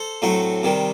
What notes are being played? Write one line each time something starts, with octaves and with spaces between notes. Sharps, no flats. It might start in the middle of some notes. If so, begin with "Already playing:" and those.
Already playing: A4 C5
A2 F#3 A3 C4
C3 D#3 G3